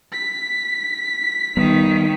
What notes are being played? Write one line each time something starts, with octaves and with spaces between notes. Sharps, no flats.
B6
D#3 G3 B3